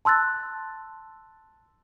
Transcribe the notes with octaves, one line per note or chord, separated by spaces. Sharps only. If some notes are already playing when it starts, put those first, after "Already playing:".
A5 C6 E6 F#6 A6